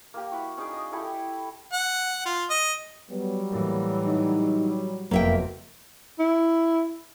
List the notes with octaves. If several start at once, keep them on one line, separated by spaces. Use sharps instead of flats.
A#3 G4
E4 F#4
C#4 D#4 G#4 D5
D#5
E4 G4 A4 D5
F#5
F4
D#5
F#3 G3 B3
A2 E3 A#3
D#4
F#1 F2 B2 A#3 E5 G5
E4